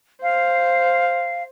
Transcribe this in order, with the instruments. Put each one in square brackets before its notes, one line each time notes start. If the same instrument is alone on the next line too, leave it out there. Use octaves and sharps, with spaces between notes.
[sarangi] C5 [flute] F5